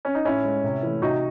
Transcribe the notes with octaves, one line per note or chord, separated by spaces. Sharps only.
C#4
D#4
A2 C#4 E4
G#3
C3
E3 A3
C3 D#4 F#4